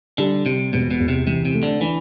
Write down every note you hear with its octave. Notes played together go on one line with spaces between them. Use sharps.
D3 G3
C3 G3
E1 B2
B2
E2
C3
C3 E3
C3
A3
D3
E3 D4